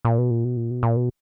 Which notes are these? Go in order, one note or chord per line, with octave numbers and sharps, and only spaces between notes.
A#2
B2
A#2
B2
A#2
B2
A#2
B2